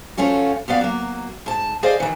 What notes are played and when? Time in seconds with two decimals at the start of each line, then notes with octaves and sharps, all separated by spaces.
0.17 F3 A3 C#4 F4 F#4
0.68 F2 B3 D5 F5
0.81 F#3 A#3
1.46 G#2 A5
1.83 G#4 C5 D5 D#5 F5
2.00 D#3 E3